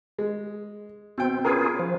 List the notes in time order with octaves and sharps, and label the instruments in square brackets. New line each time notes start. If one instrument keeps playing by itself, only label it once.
[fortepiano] G#3
[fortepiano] B2 G5 [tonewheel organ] C4
[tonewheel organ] C#4 F4 G#4 [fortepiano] A#4 B4
[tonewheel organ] F3